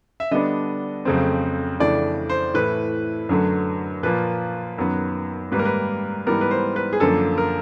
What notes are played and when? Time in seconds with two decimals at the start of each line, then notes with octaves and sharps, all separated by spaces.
0.20 E5
0.31 D3 G3 B3 D4 D#5
1.05 F2 C#3 F#3 A3 C4
1.80 F2 C#3 E3 A3 D4 D5
2.30 C5
2.54 A2 E3 A3 B4
3.29 F#2 D3 F#3 A3
4.03 A#2 F3 A#3 B4
4.78 F#2 D#3 F#3 B3
5.52 G#2 D#3 G3 A#3 B4
5.59 A#4
5.65 B4
6.27 G#2 E3 G3 B3 A#4
6.41 B4
6.51 C5
6.76 B4
6.93 G#4
7.00 F#2 D3 F3 A#3 A4
7.38 A#4